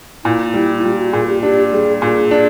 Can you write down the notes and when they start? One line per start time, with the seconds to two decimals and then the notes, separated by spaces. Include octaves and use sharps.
0.24 A#2 E4
0.54 G3 E4
0.78 E4
0.84 G3 F4
0.92 G4
0.99 F#4
1.13 A#2 G#4
1.28 G4
1.43 D4 G4
1.73 G3 G#4
2.02 A#2 G#4
2.31 D4